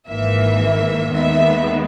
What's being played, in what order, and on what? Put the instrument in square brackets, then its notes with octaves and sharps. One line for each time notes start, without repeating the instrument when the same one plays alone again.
[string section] G#1 G#2 E3 A#3 E5
D#2 D#3 G#3 B3 E5